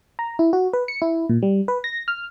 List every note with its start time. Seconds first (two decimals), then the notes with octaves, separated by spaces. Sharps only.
0.19 A#5
0.39 E4
0.53 F#4
0.73 B4
0.88 C#7
1.02 E4
1.29 A#2
1.43 G3
1.68 B4
1.84 A#6
2.08 F6